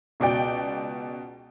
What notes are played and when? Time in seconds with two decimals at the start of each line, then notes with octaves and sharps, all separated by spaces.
0.20 C#2 B2 D5 G5